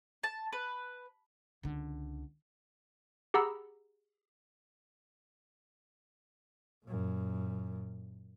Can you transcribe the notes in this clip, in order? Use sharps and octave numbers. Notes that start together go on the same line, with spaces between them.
A5
B4
C#2 D3
G4 G#4 F#5 A#5 B5 E6
F#2 A#2